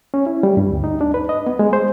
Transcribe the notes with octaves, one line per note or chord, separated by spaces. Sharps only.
C#4
E4
G3
G2
D2
D#4
D4
B4
D#5
B3
G#3
C5